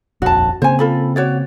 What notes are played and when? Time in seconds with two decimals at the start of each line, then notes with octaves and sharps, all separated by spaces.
0.22 D#1 A#1 F2 F#4 A5
0.62 C#3 A#3 C4 C5 G#5
0.79 F4 A4 B5
1.16 F#4 C#5 D5